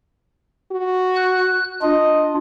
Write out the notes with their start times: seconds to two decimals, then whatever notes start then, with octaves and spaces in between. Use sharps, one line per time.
0.72 F#4
1.16 F#6
1.82 D4 F4 D#5